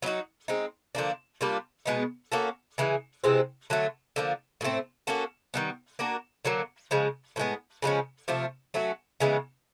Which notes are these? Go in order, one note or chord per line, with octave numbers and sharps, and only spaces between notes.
F#3 B3 D#4 F#4
G#3 C4 D#4
D3 F3 A#3 D4
G3 A#3 D4 F4
B2 G#3 B3 D#4
A#3 C#4 F#4 A4
C#3 E3 G#3
C3 E3 G#3 C4
D3 F#3 A3
D3 F3 A#3
A2 F#3 A3 C4
A#3 C#4 F#4 A4
D#3 G3 B3
A#3 D4 F#4 A#4
D3 F#3 A#3
C#3 F3 G#3
A2 F3 G#3 B3
C#3 F3 G#3 C#4
C3 F3 A3
F#3 A3 C#4 F#4
C#3 E3 G#3 B3